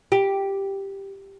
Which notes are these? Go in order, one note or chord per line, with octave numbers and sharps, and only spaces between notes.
G4